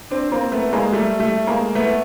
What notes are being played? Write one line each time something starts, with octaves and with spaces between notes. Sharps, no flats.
C4 D4
A#3 C4
A3 B3
G#3 A#3
G3 A3
G3 A3
G#3 A#3
A3 B3